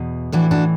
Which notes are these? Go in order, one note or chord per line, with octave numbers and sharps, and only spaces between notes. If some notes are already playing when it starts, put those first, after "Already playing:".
Already playing: E2 B2
A2 E3 D4 F#4
D4 F#4